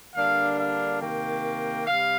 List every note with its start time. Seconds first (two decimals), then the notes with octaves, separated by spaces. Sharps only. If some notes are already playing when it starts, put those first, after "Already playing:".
0.15 D3 G3 A#3 D4 F5
0.59 F5
1.01 C3 D#3 A#3 G5
1.86 C3 G3 F5